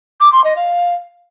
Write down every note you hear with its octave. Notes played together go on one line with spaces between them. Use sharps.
D6
C6
D#5
F5